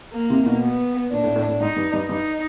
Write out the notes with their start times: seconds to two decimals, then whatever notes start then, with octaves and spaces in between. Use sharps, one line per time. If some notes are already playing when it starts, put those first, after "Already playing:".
0.14 A#3
0.30 C3
0.46 B2
0.63 B3
1.11 A#2 D4
1.24 A2
1.35 A2
1.48 A2
1.60 G#2 D#4
1.76 G2
1.93 G2
2.09 G2 D#4